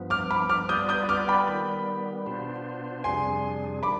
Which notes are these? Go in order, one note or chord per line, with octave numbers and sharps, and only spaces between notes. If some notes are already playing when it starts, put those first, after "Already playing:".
Already playing: G2 F3 B3
D6 F6
B5 D6
D6 F6
G3 B3 F4 B4 D5 D#6 G6
D#6 G6
D6 F6
G5 B5
D#3 G3 B3
B2 B3 D4 F4 C5
F2 C3 G3 D4 G#4 G#5 C6
D#3 G3 D4 B5 D6